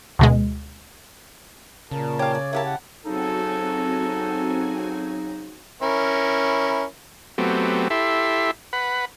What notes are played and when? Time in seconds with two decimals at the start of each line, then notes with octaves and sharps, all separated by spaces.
0.19 D2 B2 G#3
1.91 A#2 C#3 A#4 A5
2.19 G4 C#5 F5
2.35 D5
2.53 E4 G4 A#4 E5 F5 A5
2.65 F#5
3.06 C#3 F#3 C4 D#4 F#4 A4 G#5
5.82 C#4 E4 A#4
7.38 F#3 A3 B3 C4 G4
7.90 E4 G4 A4 E5 B5 C6
8.73 B4 F#5 B5